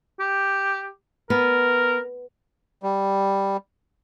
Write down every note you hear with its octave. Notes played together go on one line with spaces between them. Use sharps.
G4
B3 A#4
G3